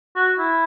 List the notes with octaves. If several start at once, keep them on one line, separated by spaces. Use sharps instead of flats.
F#4
E4